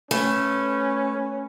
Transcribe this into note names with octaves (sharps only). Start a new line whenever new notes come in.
A3 C#4 B4